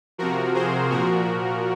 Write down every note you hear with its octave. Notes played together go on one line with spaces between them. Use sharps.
C3 F3 F#4 A#4
G#4 C5
A#2 F3 F#4 A#4